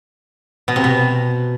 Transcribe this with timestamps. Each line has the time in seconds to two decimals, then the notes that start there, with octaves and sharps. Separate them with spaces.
0.68 B2
0.76 C3
0.84 B2